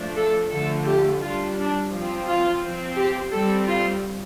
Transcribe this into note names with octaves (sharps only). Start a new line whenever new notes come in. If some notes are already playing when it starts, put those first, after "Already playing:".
Already playing: F3 A3 D4
A4
D3 F3 A3 A4
G4
G3 D4 F4
D4
F3 C4
F4
F3 C4
G4
G3 C4 A4
F4